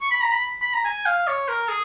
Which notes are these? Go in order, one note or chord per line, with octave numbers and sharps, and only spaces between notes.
C#6
B5
A#5
B5
B5
A#5
G#5
F5
C#5
A#4
G#4